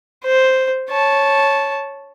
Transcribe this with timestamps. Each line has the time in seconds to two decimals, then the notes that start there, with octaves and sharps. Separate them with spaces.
0.25 C5
0.90 C#5 A5